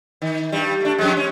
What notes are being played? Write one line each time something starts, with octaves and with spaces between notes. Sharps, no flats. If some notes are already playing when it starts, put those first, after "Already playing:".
D#3
G2 G3
A3 D4
F2 G#3
C#4